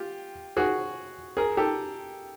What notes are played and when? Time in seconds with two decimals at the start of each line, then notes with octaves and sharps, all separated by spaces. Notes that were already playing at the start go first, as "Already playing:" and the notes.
Already playing: F4 G4
0.57 F#4 G#4
1.37 G#4 A#4
1.57 G4 A4